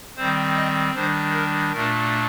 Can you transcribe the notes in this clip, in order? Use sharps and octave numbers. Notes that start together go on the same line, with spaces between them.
D#3 G3 C4 C5
D#5
D#3 G3 D4 C5
A#4
A#2 A3 D4 A#4